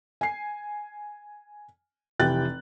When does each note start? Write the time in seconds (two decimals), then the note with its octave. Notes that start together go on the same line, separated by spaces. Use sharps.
0.21 G#5 C7
2.19 F1 E3 G4 G5 F#6 A6